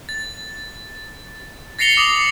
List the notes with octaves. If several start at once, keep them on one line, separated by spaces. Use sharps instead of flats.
A6
A6 A#6 C7 C#7 F7 G7
D6 D#6 C7 F7 F#7